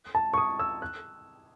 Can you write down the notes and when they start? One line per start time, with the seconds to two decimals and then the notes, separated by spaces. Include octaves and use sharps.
0.15 A5
0.34 C#6
0.38 D#6
0.59 E6
0.82 F#6